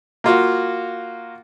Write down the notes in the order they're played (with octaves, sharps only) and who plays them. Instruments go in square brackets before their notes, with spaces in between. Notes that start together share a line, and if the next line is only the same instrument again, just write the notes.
[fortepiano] A#3 F4 F#4